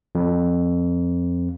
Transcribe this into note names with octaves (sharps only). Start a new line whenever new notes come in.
F2